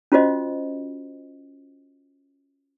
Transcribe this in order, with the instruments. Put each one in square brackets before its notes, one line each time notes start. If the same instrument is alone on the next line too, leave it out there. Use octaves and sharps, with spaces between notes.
[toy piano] C#4 F4 F#4 C5 D#5